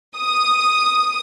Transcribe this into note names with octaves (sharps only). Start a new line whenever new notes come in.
D#6